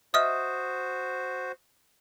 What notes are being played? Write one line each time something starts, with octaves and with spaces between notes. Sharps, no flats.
F#4 C5 D#5 E5 D#6 F6